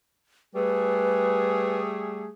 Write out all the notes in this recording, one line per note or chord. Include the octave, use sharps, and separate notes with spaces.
G3 A3 G#4 B4